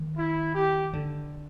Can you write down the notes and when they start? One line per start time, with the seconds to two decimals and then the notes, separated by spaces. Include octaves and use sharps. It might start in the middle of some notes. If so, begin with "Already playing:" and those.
Already playing: D#3
0.17 E4
0.55 G4
0.93 D3